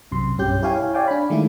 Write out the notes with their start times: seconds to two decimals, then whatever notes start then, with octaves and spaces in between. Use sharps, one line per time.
0.11 B1 F#2 C3 C6
0.38 B1 G2 C#4 G4 G6
0.62 E4 G4 C#5 F5 G#5
0.94 C#5 D5 F5 G5 G#5
1.08 D4 B5
1.30 D#3 G#3 A3 E4